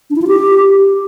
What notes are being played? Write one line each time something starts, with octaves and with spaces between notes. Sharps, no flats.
D4
E4
F4
G4